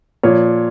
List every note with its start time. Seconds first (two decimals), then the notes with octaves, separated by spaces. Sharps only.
0.23 A#2 F3 C#5